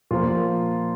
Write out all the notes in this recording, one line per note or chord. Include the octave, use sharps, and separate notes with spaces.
A#2 F3 A#3 F4